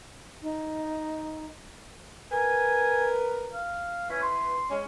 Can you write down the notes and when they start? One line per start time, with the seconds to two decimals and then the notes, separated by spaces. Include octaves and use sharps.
0.42 D#4
2.32 A#4 B4 G#5
3.53 F5
4.10 C#4 E4 B4
4.22 C6
4.70 G#3 C#4